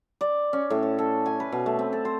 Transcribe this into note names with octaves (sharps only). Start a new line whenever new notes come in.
D5
C#4
A2
A5
A4
G#5
B4
B2
A3
C4
A4
C5